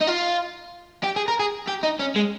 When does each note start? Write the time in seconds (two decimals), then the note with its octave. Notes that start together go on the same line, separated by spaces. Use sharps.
0.01 D#4
0.08 F4
1.04 G4
1.16 G#4
1.28 A#4
1.40 G#4
1.68 G4
1.83 D#4
2.00 C#4
2.16 G#3